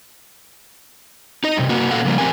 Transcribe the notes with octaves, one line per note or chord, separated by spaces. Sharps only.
D#4 D#5
G2 C3
A#3 F#4
A#2 D#3 A#3 A4 F5 F#5
C#3 F3 G3 A#3
C4 G4 A#4 G#5